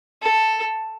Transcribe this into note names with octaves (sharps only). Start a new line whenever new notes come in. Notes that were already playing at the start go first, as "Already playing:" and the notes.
A4